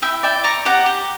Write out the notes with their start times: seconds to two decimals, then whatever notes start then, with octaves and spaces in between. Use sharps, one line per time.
0.02 E4 E5 G5
0.23 D5 E5 G5
0.44 D5 A#5 C#6
0.65 G4 F#5 A#5
0.86 G4